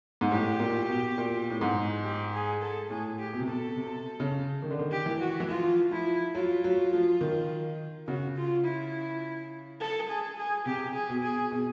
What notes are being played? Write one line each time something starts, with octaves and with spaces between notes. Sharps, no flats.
G#2
A2 G4
A#2
B2
A#2
A2
G#2
G4
G#4
A4
A2 G#4
G4
B2
C3
B2 A4
C3
C#3
D#3
D3
D#3
G4
E3
F#4
E3
F3 F4
F3 E4
F#3 F4
F#3
F3
D#3
C#3 F#4
F4
E4
A4
G#4
G#4
C3 G4
G#4
B2
G#4
B2